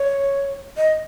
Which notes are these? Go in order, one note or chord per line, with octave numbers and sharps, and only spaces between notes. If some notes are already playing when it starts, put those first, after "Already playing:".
Already playing: C#5
D#5